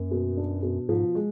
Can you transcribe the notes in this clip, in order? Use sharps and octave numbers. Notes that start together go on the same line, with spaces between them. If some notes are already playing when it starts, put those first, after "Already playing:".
Already playing: F#2 A#3
B2
D4
B2
G#2 F3
G#3